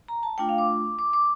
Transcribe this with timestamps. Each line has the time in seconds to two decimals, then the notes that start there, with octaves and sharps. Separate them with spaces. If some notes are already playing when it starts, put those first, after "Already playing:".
0.08 A#5
0.23 A5
0.38 A3 D4 F4 G5
0.49 F5
0.58 D6
0.99 D6
1.13 D6